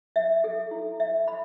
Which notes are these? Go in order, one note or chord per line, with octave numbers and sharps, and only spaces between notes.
E5
A4
E4
E5
B5